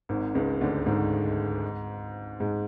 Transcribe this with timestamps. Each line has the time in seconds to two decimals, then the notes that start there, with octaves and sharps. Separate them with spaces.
0.09 G#1 G#2
0.35 C#2 C#3
0.61 D2 D3
0.80 A3
0.86 G#2 G#3
2.40 G#2 G#3